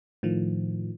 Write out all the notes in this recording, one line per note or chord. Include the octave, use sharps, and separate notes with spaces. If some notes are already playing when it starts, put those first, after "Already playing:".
A2 D#3 F3